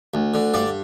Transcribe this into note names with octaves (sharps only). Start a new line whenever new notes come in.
D2
D3
G2 D5